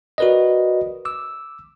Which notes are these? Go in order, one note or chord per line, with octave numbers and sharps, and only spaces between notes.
F#4 A#4 B4 D5 D#5
D6 E6